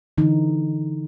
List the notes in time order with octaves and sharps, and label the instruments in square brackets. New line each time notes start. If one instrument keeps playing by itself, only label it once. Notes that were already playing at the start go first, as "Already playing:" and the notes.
[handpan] D3 E3 D#4